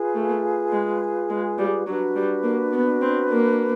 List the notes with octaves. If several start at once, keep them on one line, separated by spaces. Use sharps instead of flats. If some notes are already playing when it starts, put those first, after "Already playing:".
Already playing: F4 G#4 B4
A3
G#3
G#3
G3
F#3 D4 F#4 B4
G3
A#3
B3
C4
A#3